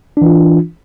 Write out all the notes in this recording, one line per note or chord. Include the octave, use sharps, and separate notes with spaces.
E3 D4 F4